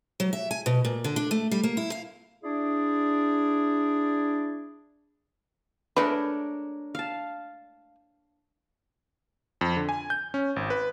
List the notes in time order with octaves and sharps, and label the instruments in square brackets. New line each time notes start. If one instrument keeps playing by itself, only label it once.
[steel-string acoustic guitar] F#3
E5
G#5
B2
A#2
D3
D4
A3
G3
A#3
E4
F5
[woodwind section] D4 E4 G#4 D5
[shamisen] G#3 A3 B4 [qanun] D4 A#4 C#5
[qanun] F5 A5
[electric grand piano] F2
D3
G#5
G6
C#4
G#1
B4